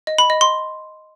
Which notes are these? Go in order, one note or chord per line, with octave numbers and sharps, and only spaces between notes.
D#5
B5
D#5
C6